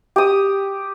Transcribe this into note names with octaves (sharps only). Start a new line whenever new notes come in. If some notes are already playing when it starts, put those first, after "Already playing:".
G4 D#6